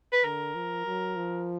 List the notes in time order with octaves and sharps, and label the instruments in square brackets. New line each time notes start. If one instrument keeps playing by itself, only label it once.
[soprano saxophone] B4
[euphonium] D3 [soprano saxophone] A#4
[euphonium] F3
F#3
F3